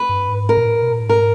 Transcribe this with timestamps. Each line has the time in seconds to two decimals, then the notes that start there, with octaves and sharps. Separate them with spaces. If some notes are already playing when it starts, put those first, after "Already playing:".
Already playing: B4
0.09 G2
0.29 G#2
0.49 A2 A#4
0.57 A#2
0.66 A2
0.82 B2
0.92 A#2
1.00 A2
1.09 G#2 A#4